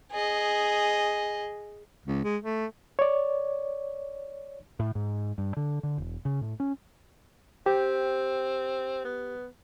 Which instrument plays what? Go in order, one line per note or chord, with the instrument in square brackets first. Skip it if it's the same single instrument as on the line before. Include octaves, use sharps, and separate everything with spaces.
[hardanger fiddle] G#4 D#5
[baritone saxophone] C#2
G#3
A3
[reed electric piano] C#5 D5
[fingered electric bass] A2
G#2
G2
D3
D3
E1
C#3
A2
C#4
[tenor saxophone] C4 [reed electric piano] G4
[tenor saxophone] B3